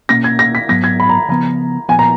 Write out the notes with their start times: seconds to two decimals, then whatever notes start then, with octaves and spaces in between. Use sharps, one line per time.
0.09 B2 A#3 C#4 A#6
0.24 G#6
0.39 A#6
0.55 B6
0.69 G#2 F#3 B3 A#6
0.84 G#6
1.00 B5
1.09 A#5
1.29 C#3 F3 B3 A#5
1.89 A#2 F3 B3 G#5
1.99 A#5